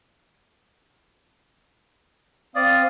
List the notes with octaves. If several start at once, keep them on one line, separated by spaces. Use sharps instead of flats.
C4 D5 F5 D#6